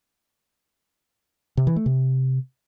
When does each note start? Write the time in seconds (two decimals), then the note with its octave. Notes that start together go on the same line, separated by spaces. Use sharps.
1.57 C3
1.67 E3
1.76 A3
1.86 C3